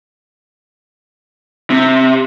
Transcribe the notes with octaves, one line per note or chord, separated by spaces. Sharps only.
C3